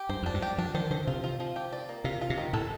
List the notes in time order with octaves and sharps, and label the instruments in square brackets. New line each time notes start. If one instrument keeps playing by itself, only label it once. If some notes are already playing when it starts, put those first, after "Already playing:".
Already playing: [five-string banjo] G4
[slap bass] G2 [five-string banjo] C5
[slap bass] F2
[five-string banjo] D4
[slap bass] G2
[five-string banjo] G4
[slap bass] F3 [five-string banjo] D4
[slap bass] D#3 [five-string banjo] C5
[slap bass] D3 [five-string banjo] C5
[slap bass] C3 [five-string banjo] F4
[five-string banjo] F4
F3
G4
D5
A#3
[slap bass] C3 [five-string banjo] F4
[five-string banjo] F4
[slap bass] C3
[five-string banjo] D#3
[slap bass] A2 [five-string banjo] A4